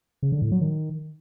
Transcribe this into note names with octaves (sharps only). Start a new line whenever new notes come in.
C#3
D3
A2
F#3
D#3